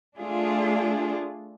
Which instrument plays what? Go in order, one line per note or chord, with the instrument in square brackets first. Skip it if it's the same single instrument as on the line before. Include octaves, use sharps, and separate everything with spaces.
[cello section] A3 D4 F4 G#4